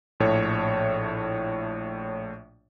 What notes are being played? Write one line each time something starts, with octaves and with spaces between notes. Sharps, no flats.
A#1 A2 C#5 A5